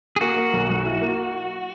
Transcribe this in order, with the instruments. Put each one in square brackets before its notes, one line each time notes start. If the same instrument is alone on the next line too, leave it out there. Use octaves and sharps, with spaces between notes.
[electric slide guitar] G#4
[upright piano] A#3 [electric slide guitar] F#4
[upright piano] A#3
B1
B1
E4
A#3